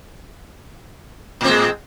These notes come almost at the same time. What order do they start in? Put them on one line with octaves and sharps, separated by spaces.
A2 C4 G#3